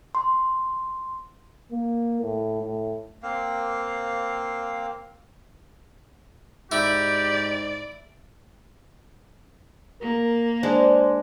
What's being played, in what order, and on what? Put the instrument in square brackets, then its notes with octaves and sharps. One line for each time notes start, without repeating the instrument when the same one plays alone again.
[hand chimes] C6
[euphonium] A#3
A2
A2
[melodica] A#3 C4 F5
[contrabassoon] G#2 [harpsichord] E4 [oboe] G4 [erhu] D5
[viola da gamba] A#3 [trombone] A#4
[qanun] G#3 D4 [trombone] C5